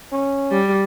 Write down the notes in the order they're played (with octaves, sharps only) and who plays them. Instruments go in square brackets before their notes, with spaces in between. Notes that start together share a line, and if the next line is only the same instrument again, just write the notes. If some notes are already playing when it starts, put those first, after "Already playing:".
[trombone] C#4
[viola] G3